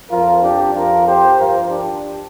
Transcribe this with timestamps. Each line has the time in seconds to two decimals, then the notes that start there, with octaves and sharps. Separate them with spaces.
0.11 F2 F3 F4 A#4
0.43 D4 G4
0.74 F2 F3 F4 A#4
1.06 G4 C5
1.38 G2 F3 F4 A#4
1.70 D4 G4